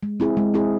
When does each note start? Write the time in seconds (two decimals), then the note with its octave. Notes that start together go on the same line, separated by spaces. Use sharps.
0.03 G#3
0.20 C4 E4 G#4
0.37 G#3
0.54 C4 E4 G#4